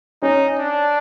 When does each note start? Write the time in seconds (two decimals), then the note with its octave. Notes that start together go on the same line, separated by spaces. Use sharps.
0.22 C#4 D#4
0.58 D4